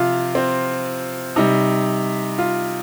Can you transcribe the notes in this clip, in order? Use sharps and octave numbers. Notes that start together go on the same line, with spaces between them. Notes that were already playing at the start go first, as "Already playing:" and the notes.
Already playing: C3 F3 F4
C4
C3 G3 D#4
F4